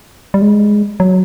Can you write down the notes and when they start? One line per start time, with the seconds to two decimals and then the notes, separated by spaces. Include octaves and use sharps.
0.34 G3
0.42 G#3
1.00 F#3